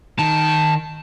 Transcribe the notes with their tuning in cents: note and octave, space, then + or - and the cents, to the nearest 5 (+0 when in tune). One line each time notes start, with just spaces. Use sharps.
D#3 +0 A5 +0